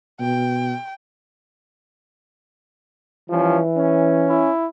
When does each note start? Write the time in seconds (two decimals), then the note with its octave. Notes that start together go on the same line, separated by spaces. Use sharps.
0.20 B2 G5
3.30 E3 F3 G3 C#4
3.76 C#4
4.29 E4